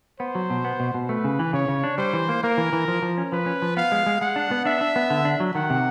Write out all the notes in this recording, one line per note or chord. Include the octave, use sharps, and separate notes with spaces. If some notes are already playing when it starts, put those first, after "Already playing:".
B3 C5
F#3
B2
B3
B2
B2
A3 B4
C#3
E3
C#3 C#5
C#3
D4
G3 C5
E3
A#3
A#3 A#4
E3
E3
F3
F3
C#4
F3 B4
C#4
F3
B3 F5
G#3
G#3
G#3 F#5
D4
B3
D4 E5
D4
B3
D3
D4
F#3
D#3 F#5
C3